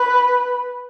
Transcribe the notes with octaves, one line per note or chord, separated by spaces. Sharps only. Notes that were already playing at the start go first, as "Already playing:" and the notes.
Already playing: B4